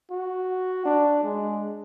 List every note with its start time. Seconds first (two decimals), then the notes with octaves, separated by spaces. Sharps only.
0.11 F#4
0.86 D4
1.23 G#3